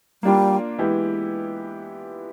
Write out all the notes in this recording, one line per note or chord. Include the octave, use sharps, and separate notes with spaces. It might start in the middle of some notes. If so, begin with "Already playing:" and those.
G3 A#3 D4 F4
E3 G#3 B3 E4 G4